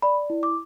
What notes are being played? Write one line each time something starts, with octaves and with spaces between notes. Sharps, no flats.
D5 B5
E4
D6